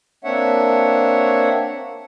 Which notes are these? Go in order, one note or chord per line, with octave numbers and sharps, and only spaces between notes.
A#3 C4 D4 C#5 E5 F#5